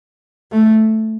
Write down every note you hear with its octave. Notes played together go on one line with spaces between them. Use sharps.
A3